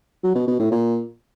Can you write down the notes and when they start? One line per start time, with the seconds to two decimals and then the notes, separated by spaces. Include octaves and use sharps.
0.24 F#3
0.36 B2
0.48 B2
0.60 A2
0.72 A#2